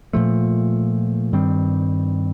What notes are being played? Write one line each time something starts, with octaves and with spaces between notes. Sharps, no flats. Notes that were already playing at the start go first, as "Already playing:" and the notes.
A#2 F3 A3
G2 D#3 G3 C4